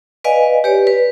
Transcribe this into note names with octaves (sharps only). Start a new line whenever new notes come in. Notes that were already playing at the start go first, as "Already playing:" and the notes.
B4 D5 D#5 F5 G#5
G4 B4 C#5 D5
B4